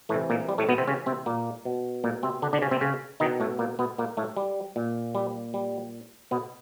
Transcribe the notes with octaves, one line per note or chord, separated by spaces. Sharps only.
A2 C3 E3 A3
A#2 A#3
G3
A2 A3
B2 B3
C3 C4
C#3 C#4
C3 C4
A#2 A#3
B2
A#2 A#3
C3 C4
D3 D4
D3 D4
C#3 C#4
C3 C4
C#3 C#4
B2 D#3 D#4
A2 A3
A#2 A#3
B2 B3
A#2 A#3
A2 A3
G3
A#2
G3
G3
B2 B3